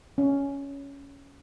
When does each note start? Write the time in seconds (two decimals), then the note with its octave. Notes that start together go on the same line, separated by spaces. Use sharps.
0.18 C#4